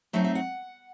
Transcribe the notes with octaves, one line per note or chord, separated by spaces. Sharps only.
F#3 A3 C4 D#4 E5
E5
F#5